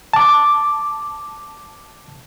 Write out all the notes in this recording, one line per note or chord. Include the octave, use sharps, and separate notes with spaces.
A5 D6